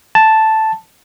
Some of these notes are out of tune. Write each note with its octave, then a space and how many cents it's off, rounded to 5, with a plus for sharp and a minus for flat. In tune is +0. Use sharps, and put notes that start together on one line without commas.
A5 +0